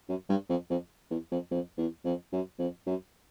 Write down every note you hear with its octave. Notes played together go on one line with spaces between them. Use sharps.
F#2
G2
F2
F2
E2
F2
F2
E2
F2
F#2
F2
F#2